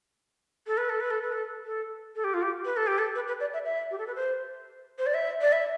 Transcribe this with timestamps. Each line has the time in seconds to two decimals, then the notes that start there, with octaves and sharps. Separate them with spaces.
0.67 A4
0.77 B4
0.89 A4
1.00 B4
1.10 A4
1.22 B4
1.32 A4
1.66 A4
2.16 A4
2.24 G4
2.34 F4
2.42 G4
2.65 B4
2.77 A4
2.87 G4
2.98 A4
3.15 B4
3.28 B4
3.40 D5
3.53 E5
3.65 E5
3.91 G4
3.98 A4
4.07 B4
4.15 C5
4.98 C5
5.06 D5
5.14 E5
5.41 D5
5.52 E5